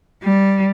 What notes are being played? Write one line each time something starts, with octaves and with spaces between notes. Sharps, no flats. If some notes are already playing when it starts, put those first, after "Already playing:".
G3